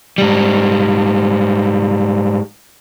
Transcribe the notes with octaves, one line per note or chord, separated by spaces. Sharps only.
G#2 G3